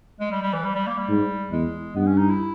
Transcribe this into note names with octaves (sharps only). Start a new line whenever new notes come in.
G#3
G3
G3
E3
G3
G3
A#3
G3
G#2
E2 G#3
G2 B3
C#4
D#4
E4